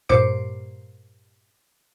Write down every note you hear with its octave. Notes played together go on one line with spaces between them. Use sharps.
G2 A#2 A#3 C5 D6 C#7